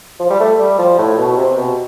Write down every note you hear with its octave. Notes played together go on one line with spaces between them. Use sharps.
F3
G3
A3
G3
F3
A2
B2
C3
B2